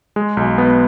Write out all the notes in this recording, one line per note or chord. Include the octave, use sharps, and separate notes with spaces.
G#3
B1
B3